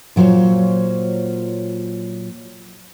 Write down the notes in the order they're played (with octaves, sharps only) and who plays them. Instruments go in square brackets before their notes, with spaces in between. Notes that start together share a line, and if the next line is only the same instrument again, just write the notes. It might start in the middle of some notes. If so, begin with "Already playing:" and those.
[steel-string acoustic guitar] A#2 F#3 F4 C5 C#5